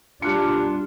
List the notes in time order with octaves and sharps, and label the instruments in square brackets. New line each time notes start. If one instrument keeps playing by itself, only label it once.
[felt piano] G3 F#6 C#7 [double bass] D4 [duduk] F4